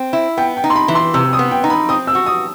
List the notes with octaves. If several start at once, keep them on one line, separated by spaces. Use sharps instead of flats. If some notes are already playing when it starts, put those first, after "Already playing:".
Already playing: C4
E4
B3 G5
G5
D#4
C6
B5
E3
C6
C3 E6
D#6
B3
G5
D#4
B5
C4 D#6
E6
F#4
D#6